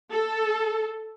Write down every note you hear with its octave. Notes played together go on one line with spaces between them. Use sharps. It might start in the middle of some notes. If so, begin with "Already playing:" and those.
A4